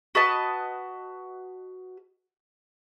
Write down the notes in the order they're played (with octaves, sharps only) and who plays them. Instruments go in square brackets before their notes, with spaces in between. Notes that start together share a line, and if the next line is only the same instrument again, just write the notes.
[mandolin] F#4 B4 D#5 A5